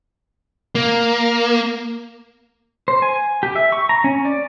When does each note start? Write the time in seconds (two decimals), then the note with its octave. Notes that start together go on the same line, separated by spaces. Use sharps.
0.75 A#3
2.88 C5
3.02 G#5
3.43 G4
3.56 E5
3.72 C#6
3.89 A#5
4.04 C#4
4.25 D5